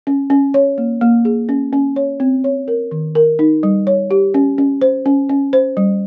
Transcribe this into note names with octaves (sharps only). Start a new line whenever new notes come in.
C#4
C#4
C#5
A#3
A#3
G#4
C#4
C#4
C#5
C4
C#5
A#4
D#3
A#4
D#4
G3
C#5
G4
C#4
C#4
C5
C#4
C#4
C5
G3